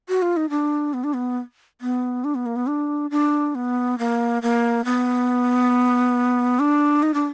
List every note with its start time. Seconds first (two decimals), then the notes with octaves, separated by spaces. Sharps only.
0.09 F#4
0.22 F4
0.37 D#4
0.50 D4
0.93 B3
1.04 D4
1.13 B3
1.81 B3
2.24 D4
2.35 B3
2.46 A#3
2.56 B3
2.68 D4
3.11 D4
3.55 B3
3.98 A#3
4.42 A#3
4.85 B3
6.59 D4
7.02 D#4
7.14 D4